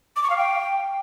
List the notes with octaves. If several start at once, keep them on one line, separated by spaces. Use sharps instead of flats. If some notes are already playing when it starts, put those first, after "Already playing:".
D6
C#6
F5
G5